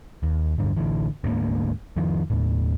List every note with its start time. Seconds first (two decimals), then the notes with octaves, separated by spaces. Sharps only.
0.23 D#2
0.58 D1 G2 D3
0.77 A1 D3 E3
1.24 D2 G#2 A#3
1.97 F2 D#3 F3
2.30 D#2 A2